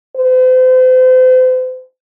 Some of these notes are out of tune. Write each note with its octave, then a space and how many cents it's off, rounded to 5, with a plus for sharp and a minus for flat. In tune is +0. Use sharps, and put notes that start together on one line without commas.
C5 -40